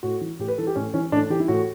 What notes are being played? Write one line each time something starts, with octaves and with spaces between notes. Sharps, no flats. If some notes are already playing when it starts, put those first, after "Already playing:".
A2 F#4
E3
A2 G4
B4
E3 A4
G4
A2 C#4
E3 C#4
A2 D4
E3 G4
E4
A2 F#4